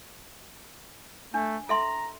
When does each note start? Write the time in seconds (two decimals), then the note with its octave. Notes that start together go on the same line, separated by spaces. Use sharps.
1.34 A3 D4
1.69 A4 E5 A#5 C6